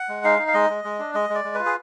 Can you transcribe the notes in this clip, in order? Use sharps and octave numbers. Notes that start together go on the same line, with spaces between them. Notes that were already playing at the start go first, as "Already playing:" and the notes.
Already playing: F#5
G#3
D#4 F5
D#4
F5
G#3 D#5
G#3
G#3
D4
G#3 D#5
G#3
D5
G#3
F4 B4
G#4